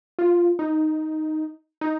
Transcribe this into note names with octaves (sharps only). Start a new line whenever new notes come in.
F4
D#4
D#4